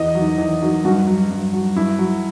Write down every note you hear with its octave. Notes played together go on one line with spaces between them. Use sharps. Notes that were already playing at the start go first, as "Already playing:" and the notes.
Already playing: E2 D#5
D#3 F#3
E2
D#3 F#3
G2 F#4
F#3
G2
F#3
G2 E4
F#3